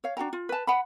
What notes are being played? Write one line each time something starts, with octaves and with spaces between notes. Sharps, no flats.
C#5 F5
D4 F#4 G5 A#5
F4
B4 A5
F#5 B5